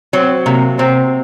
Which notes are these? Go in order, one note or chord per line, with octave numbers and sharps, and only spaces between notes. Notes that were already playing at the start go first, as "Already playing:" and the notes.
F#3 C4
C3 A#3
C3 C4